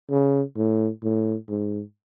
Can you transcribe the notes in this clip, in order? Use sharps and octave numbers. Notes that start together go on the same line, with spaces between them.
C#3
A2
A2
G#2